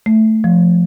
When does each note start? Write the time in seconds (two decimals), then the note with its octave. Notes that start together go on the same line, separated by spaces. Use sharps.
0.06 A3
0.44 F3